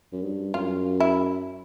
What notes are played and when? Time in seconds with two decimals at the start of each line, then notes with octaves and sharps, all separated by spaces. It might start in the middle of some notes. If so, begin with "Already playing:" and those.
0.12 F#2
0.22 G2
0.54 F#2 F4
1.00 E4